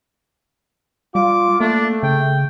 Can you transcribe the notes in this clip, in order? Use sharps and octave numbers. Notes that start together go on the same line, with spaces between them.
G3 F4 D6
A3 A#3 D4
C#3 G5